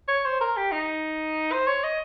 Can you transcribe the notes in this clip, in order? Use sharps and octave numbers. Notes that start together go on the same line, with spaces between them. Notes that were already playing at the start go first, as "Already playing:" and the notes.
C#5
C5
A#4
G4
D#4
C5
C#5
D#5